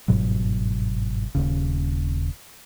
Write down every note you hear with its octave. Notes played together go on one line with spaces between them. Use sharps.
G1 G#2 B2 F#3
D#1 D#2 C#3